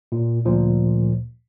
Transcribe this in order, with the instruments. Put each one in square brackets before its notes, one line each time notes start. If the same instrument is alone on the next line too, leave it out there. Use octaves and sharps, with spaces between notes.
[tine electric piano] A#2
D2 A#2 F3